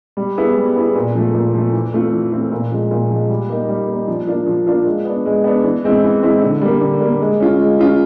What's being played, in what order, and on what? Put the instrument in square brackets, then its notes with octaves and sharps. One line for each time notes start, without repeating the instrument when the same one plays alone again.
[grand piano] G3
B3 E4 G#4
G3
B3 E4 G#4
A#2
F3 A3
A#2
F3 A3
E3
A3 C4 F4
E3
A3 C4 F4
A#2
F3 G#3
A#2
F3 G#3
G3
A#3 D#4
G3
A#3 D#4
F3
A#3 D4 F4
F3
A#3 D4 F4
G#3
B3 D4
G#3
B3 D4
E3
G#3 C4 E4
E3
G#3 C4 E4
D3
G3 A#3
D3
G3 A#3
G#3
C#4 F4
G#3
C#4 F4